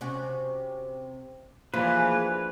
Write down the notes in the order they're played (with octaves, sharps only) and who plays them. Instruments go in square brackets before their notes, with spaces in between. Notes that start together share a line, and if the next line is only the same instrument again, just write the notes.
[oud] C3 C#4 F#4
[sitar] C3 E3 G#3 [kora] F3 D4 [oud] A#3 [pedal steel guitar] B4